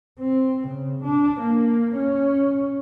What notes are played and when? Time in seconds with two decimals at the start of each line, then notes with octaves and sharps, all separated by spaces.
0.19 C4
0.67 C#3
1.03 D4
1.40 A#3
1.95 C#4